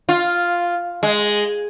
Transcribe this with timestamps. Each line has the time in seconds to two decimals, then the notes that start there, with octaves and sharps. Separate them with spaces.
0.09 F4
1.03 G#3